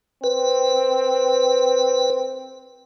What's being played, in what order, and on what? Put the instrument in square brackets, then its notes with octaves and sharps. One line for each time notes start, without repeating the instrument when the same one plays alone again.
[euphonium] C4 [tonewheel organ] B4